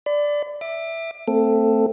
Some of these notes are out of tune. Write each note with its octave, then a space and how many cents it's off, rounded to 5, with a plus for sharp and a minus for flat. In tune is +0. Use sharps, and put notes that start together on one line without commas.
D5 +0 B5 +40
E5 +0 D6 +30
A3 +30 C4 +0 A4 +5